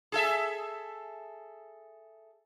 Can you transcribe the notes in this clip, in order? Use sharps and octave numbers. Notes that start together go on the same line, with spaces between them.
G#4 A4 E5